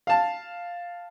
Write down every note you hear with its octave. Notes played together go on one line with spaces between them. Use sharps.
F5 A5